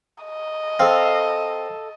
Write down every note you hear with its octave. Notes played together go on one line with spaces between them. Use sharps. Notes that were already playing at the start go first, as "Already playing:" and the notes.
D#5
C4 A4 F5